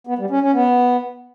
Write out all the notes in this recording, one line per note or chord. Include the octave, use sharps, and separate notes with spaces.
B3
G3
C#4
C#4
B3